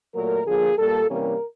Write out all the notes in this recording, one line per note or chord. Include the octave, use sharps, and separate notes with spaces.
A#2 F#3 A3 A#4
D3 F3 A#3 G#4
A#2 G3 A#3 A4
C3 E3 G3 A#3 C#4 A#4